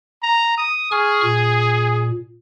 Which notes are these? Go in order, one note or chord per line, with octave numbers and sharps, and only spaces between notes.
A#5
D#6
G#4 G#5 C#6 F6
A#2